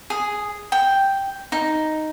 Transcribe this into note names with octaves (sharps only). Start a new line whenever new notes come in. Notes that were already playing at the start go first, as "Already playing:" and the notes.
G#4
G5
D#4